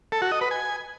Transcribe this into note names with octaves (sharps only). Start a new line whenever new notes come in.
A4
F#4
D#5
B4
G#5